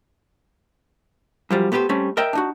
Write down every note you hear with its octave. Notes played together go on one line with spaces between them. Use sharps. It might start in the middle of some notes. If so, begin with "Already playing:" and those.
F#2 F3 G3
A3 B3 G4 B4 C5
G3 A3 C4 C#4
A#4 D#5 E5 G5
D4 D#4 F#4